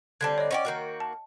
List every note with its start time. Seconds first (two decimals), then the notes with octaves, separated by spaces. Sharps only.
0.21 D3 G3 C4 A5 G#6
0.38 C#5 D#5
0.51 C#4 C5 D5 D#5 F#5 G5
0.65 D#3 A#3 F#4
1.00 A5